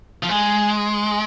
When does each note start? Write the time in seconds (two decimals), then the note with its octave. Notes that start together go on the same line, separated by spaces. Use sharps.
0.23 F3
0.29 G#3